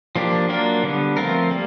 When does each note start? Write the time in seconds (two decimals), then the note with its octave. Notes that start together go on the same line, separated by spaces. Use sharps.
0.16 F3 A#3 D4 G4
0.49 F#3 A#3 D4 F4 A#4
0.83 D3 G3 B3
1.17 F3 A3 C4 F4 A#4
1.51 G3 A#3